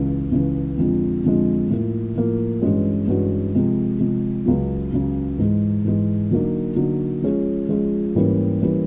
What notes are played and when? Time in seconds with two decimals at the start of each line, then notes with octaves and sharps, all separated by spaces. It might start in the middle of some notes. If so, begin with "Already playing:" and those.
Already playing: C#2 C#3 E3
0.31 C#2 C#3 E3
0.77 F2 D3 F3 G#3
1.24 F2 D3 F3 G#3
1.69 A2 F3 A#3
2.15 A2 F3 A#3
2.62 G2 E3 G#3 C#4 F#4
3.07 G2 E3 G#3 C#4 F#4
3.54 C3 F3 G#3
4.00 C3 F3 G#3
4.46 C#2 C#3 F#3
4.93 C#2 C#3 F#3
5.38 G#2 E3 G#3
5.84 G#2 E3 G#3
6.30 D3 F#3 A#3 D#4
6.76 D3 F#3 A#3 D#4
7.22 F3 G#3 C#4 F4 G#4
7.69 F3 G#3 C#4 F4 G#4
8.15 G#2 E3 G3 A#3 C#4
8.62 E3 G3 A#3 C#4